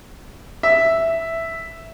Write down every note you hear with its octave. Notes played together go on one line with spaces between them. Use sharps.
E5